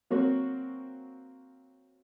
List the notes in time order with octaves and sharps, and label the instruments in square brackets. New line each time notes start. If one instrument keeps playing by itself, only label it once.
[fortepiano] F#3 A#3 C4 F#4